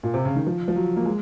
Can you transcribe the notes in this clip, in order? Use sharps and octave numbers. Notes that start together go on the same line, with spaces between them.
A#2
C3
C#3
D#3
F3
F3
F#3
A#3
G#3